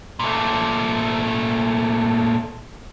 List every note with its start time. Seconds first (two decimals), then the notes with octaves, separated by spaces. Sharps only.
0.19 A#2 A3